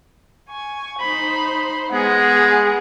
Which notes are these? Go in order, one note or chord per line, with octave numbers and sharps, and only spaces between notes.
G#5 C#6
D#4 C5 B5
G#3 B3 G#4 F#5